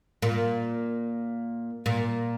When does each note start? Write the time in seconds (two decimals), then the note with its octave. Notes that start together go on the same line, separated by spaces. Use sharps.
0.22 A#2
1.86 A#2